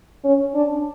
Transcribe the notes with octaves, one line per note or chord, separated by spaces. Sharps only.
C#4
D4